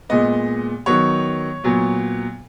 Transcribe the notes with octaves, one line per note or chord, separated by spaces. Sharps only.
A#2 G#3 B3 D#5
D#3 F#3 B3 C#5
A#2 F#3 B3